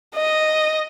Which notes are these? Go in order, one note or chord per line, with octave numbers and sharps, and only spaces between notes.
D#5